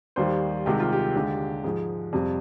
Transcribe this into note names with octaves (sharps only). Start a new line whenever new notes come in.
D#2 D#3 G3 C5
C2 C3 D#3 G#3 G4
F4
G4
D#2 D3 G#3
G#2 F3 G#3 G#4
F2 C3 G3